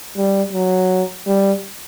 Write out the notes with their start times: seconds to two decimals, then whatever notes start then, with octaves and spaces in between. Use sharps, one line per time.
0.17 G3
0.53 F#3
1.27 G3